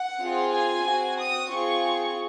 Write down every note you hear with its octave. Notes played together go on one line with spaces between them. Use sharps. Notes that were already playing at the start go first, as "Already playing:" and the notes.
Already playing: F#5
C4 F4 G#4
G#5
C4 F#4
D#6
C4 F4 G#4 C#6